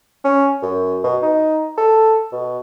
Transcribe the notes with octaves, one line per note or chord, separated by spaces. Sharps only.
C#4
F#2
B2
D#4
A4
B2